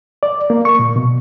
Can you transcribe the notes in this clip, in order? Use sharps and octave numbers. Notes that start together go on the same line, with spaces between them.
D5
A#3
C#6
A#2
B2